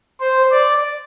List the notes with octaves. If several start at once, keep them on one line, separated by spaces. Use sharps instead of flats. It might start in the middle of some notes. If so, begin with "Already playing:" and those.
C5
D5